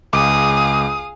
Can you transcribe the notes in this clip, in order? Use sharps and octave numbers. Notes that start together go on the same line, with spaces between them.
C#2 G#4 F5 D6 D#6